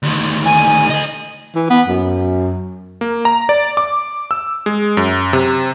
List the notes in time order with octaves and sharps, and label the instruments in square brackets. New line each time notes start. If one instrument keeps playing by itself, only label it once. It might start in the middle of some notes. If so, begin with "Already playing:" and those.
[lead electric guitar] D2 D#3
[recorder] G#5
[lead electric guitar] A4 D#5
[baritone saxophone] E3
B3
F#2
[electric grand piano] A#3
A#5
D5
D6
E6
G#3
F#2
C3